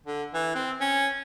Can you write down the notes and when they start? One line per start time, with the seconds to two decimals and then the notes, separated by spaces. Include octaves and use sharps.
0.06 D3
0.34 E3
0.55 C4
0.81 C#4